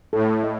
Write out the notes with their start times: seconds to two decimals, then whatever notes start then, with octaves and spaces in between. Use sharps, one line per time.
0.13 A2 A4
0.43 D#5